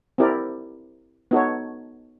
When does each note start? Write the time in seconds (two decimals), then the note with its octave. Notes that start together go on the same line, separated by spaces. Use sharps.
0.18 C4 E4 G4 A#4 D5
1.31 B3 D#4 F#4 A4 C#5